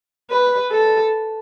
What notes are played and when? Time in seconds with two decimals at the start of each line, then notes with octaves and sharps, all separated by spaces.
0.30 B4
0.71 A4